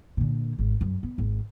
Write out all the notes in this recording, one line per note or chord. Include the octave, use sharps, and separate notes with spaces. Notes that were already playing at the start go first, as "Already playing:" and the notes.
A#2 D3
G#1
F#2
B3
G#1